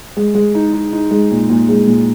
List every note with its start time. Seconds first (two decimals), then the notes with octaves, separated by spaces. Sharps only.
0.17 G#3
0.35 G#3
0.55 D#4
0.73 D#4
0.93 D#4
1.11 G#3
1.31 A#2
1.50 A#2
1.69 G#3
1.87 A#2